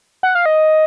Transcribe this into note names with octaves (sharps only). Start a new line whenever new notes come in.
F#5
F5
D#5